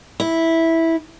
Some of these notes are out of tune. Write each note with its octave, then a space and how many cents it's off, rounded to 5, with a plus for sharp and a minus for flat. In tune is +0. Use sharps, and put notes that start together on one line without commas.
E4 -10